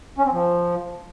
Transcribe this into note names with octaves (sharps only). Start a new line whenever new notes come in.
C#4
C4
F3